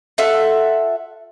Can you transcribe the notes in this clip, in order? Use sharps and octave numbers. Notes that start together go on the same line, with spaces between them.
F4 A4 E5 F#5